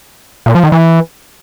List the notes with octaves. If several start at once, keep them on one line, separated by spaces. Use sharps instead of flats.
A#2
F3
D#3
E3